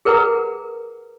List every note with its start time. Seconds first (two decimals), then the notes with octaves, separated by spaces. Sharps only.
0.05 G#4 A#4 B4 F#5 A#5 D#6